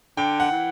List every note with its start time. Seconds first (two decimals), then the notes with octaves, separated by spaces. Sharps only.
0.17 D3 G5
0.40 F#5
0.51 E3